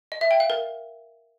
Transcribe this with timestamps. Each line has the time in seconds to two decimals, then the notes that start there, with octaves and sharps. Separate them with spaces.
0.12 D#5
0.21 E5
0.31 G5
0.40 F5
0.50 A#4